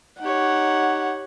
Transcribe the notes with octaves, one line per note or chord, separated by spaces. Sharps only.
D#4 G4 C#5 F#5